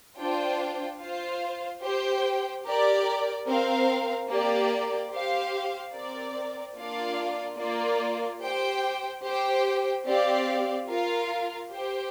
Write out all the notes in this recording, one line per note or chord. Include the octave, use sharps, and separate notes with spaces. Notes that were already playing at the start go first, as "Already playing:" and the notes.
D4 F4 C5 G5
F4 C5 F5
G4 C5 G5
G4 A#4 D5
C4 A#4 F5
A#3 G4 D5
G4 C5 F5
C4 A#4 D5
A#3 D4 F4 D5 F5
A#3 F4 D5
G4 C5 G5
G4 C5 G5
C4 G4 D5 F5
F4 A#4 F5
G4 C5 G5